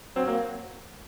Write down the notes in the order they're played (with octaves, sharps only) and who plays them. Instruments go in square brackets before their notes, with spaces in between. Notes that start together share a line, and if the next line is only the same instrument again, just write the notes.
[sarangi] F#3 [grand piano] C4
[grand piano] A#3